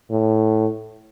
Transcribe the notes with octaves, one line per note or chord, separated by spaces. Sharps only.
A2